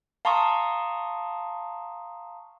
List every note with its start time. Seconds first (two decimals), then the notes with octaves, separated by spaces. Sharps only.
0.25 F5 A5 A#5 C6 C#6 D#6